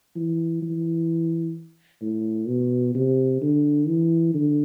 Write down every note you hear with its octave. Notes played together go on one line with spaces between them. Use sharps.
E3
E3
A2
B2
C3
D3
E3
D3